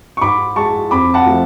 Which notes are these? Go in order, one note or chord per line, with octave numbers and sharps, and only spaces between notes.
C#6
G#2 B5 D6
G#3 A5 C#6
F2 B5 D6
F#5 A5
F3 A3